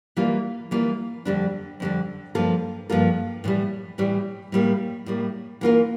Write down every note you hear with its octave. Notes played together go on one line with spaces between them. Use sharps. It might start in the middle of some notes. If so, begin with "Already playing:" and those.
E3 G3 A#3 F4
E3 G3 A#3 F4
F2 D3 G3 D4
F2 D3 G3 D4
G2 F3 A#3 F4 A4
G2 F3 A#3 F4 A4
A2 E3 G3
A2 E3 G3
A2 G3 A#3
A2 G3 A#3
E3 A#3 F4 A#4